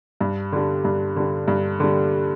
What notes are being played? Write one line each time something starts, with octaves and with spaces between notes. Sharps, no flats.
G2
D3 G3
G2
D3 G3
G2
D3 G3